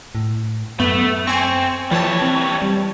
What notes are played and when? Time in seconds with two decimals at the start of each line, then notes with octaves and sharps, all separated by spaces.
0.15 A2
0.80 F#2 A3 B3
1.27 C4 G#5 C#6
1.92 E3 F3 G3 C#5 A5
2.22 C4
2.62 G3